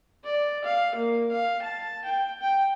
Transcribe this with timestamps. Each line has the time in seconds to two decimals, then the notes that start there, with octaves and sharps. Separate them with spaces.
0.24 D5
0.65 F5
0.96 A#3
1.31 F5
1.62 A5
2.05 G5
2.41 G5